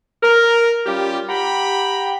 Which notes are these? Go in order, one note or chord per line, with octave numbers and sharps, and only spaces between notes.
A#4
G3 C#4 F4 G4
G4 F#5 G5 A#5 B5